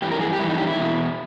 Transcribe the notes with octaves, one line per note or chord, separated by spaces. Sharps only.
G2 E3 G4
A#4
G#4
G4
G2 E3 E4
D#4
G4
E4
E2 B2